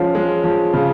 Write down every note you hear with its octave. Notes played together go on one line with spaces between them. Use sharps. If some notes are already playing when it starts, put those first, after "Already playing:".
Already playing: F3 G#3 C#4 F5
G#3
F3
C#3